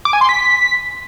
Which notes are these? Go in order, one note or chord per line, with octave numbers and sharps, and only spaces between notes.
D6
G#5
C6
B6